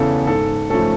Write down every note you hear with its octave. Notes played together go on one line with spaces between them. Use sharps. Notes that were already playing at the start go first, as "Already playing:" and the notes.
Already playing: E2 C#3 E3 A4
G#2 A4
F3 A3 C#4 A4